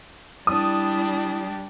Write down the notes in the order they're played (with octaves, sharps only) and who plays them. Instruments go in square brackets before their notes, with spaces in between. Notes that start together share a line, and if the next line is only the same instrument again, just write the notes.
[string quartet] G3 D4 G4 [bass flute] E4 [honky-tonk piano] D#6